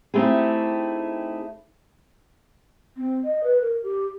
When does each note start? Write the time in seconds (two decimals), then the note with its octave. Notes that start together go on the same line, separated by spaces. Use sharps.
0.14 A3 C4 D#4 E4 G4 G#4
2.97 C4
3.24 D#5
3.44 B4
3.61 A#4
3.83 G4